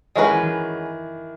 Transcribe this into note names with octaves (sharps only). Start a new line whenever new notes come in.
D#3 G#3 C#4 F#4 B4
E3
D#3